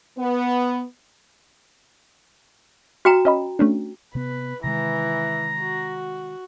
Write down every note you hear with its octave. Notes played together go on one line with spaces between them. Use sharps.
B3
F#4 G5 A#5 F6
C#4 D#5 B5
A3 C#4 D4
C3 B3 B4
C3 D#3 E3 G#3 A#5
F#4